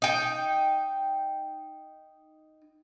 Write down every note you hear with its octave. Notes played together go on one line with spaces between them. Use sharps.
D#4 G5